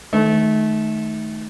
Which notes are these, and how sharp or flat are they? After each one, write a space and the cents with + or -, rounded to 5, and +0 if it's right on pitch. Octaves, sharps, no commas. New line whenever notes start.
D#3 +0 A3 -25 B4 +40